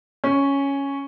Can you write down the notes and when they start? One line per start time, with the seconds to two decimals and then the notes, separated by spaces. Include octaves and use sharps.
0.24 C#4